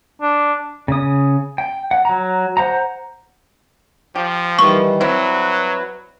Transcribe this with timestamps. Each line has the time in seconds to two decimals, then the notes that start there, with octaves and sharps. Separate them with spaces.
0.22 D4
0.88 C#3 D#6
1.58 G5
1.91 F#5
2.05 F#3 A#5
2.57 C5 F#5 A#5
4.16 F3 G4
4.59 D#3 E3 G3 C#6
5.01 F#3 G3 C4 E4 B4